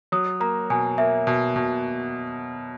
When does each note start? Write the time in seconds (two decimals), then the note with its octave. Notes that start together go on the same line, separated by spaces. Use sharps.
0.12 F#3 D#6
0.40 A#3 A#5
0.70 B2 G#5
0.98 A#3 E5
1.27 B2
1.56 B2